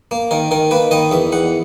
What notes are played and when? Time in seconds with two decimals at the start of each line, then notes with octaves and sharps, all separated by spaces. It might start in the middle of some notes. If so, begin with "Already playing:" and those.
0.11 A#3
0.31 D#3 A#4
0.51 D#3 A#4
0.71 A#3 B4
0.91 D#3 D#5
1.11 E2 E5
1.32 E2 F#5